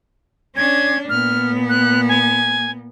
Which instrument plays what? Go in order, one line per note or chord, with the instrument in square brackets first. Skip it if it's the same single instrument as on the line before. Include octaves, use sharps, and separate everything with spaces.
[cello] C#4 D4 [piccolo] G#6
[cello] A#2 B3 [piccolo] F6
[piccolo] F#6
G#5